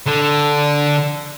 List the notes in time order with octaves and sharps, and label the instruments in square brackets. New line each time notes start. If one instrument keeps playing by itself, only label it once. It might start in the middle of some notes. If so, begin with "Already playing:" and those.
[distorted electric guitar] D3